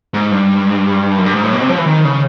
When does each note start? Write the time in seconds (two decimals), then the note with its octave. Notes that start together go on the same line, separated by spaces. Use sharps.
0.14 G#2
0.31 G2
1.18 F#2
1.26 G2
1.35 G#2
1.44 A2
1.53 B2
1.61 C3
1.69 F3
1.78 E3
1.86 D#3
2.05 C#3